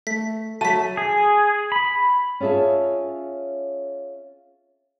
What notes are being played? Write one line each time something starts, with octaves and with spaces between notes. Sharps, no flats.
A3 B6
F#3 A3 F#4 A5 B6 D#7
G#4
B5
C#4 F4 G#4 E5 A5